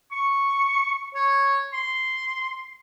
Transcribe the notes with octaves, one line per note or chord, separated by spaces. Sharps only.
C#6
C#5
C6